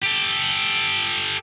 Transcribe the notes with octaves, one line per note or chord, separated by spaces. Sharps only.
G4 A4